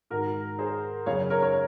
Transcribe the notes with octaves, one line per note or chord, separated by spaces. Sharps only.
G#2 D#3 F#4 A#4
G#4 C5
F#2 C#3 C#5 F5
A#4 C#5
A#4 C#5